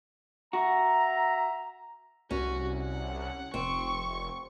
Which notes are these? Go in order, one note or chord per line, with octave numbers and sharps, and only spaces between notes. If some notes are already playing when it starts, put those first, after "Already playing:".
F#4 E5 A#5
C2 C#4 F#4
F#5
F1 C4 C#6